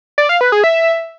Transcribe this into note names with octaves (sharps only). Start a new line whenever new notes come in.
D5
F5
B4
G#4
E5